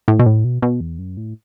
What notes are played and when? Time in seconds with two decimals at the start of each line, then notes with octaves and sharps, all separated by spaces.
0.08 A2
0.19 B2
0.26 A2
0.44 B2
0.62 B2
0.81 E2
0.99 F#2
1.17 A2